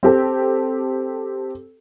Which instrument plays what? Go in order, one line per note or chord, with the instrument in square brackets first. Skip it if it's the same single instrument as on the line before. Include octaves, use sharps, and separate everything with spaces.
[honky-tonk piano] C4 G4 A4